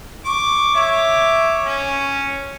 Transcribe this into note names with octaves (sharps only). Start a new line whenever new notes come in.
C#6 D6
C#5 E5 D6
C#4